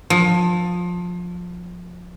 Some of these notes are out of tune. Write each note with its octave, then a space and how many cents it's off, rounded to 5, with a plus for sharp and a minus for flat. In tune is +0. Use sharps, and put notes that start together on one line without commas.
F3 +20